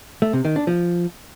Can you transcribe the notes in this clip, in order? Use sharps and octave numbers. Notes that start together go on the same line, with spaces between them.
A3
C3
D#3
D4
F3